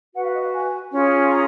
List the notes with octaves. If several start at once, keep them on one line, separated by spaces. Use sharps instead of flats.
F#4 B4 F#5
F5
D#5
F5
G#5
C#4 F4 G#4
A#5